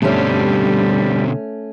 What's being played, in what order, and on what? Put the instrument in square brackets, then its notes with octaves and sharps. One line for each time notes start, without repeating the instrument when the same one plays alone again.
[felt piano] G2 [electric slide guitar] B2 D3 C4 [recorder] G3 [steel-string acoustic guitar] A3 C#4